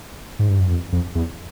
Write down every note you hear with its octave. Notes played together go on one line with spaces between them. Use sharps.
G#2
G2
F#2
F2
F2
E2